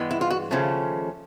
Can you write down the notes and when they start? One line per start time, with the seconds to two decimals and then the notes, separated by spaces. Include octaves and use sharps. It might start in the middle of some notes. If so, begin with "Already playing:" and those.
Already playing: G2 E3 G#3 B3
0.11 E4
0.21 F4
0.30 F#4
0.51 D#2 C#3 F3 A3 C#4